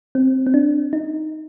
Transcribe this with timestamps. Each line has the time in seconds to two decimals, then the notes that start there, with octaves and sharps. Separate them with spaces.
0.15 C4
0.46 C4
0.54 D4
0.93 D#4